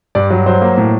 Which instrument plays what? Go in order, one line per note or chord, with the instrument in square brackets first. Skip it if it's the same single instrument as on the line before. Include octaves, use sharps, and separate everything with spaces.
[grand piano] G2 D5
F#3
F#3 C5
A#3
A2